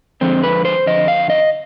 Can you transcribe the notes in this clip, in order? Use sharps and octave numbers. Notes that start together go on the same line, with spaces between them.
F2 D3 F3 G#3 C4
B4
C5
F2 D3 F3 D#5
F5
D#5